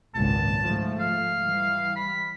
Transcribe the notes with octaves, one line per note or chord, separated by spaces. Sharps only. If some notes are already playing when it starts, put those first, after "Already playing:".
G#1 C#2 A#2 A5
G#2 F3 A3
F5
E3 G3
B5